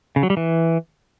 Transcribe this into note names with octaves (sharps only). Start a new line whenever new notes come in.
C#3
F#3
G3
E3